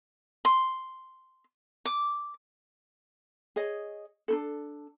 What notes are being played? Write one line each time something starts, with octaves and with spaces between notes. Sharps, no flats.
C6
D6
G#4 C#5 D#5
D4 D#4 A4